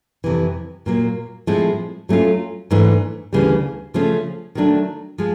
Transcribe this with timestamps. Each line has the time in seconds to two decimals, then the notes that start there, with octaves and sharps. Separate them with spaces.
0.24 F2 C3 E3
0.86 A#2 F#3 A#3
1.47 A2 F3 G#3 C4 E4
2.09 F#3 A3 C#4 F4
2.70 G#2 E3 A3 D4
3.33 D2 C#3 E3 G3
3.94 C#3 F3 A3 C#4
4.55 D#3 F#3 A3 D4
5.18 F3 G#3